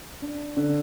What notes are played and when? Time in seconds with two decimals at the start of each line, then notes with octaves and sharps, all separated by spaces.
0.22 D4
0.57 D3